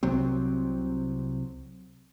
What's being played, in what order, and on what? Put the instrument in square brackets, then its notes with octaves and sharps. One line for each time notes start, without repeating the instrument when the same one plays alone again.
[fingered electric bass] C2 C3 F#3 C4